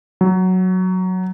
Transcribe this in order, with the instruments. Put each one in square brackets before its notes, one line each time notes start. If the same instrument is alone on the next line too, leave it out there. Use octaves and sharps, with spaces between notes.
[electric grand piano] F#3